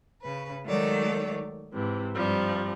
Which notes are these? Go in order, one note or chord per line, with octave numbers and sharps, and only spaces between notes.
C#3 B4
D#3 F#3 G#3 A3 C#5 D5
G#2 C3 E3
G2 C3 F3 G3